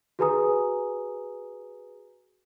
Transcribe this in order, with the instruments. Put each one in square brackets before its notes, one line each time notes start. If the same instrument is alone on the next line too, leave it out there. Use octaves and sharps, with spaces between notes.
[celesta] F#4 G#4 B4 G#5 A#5 D#6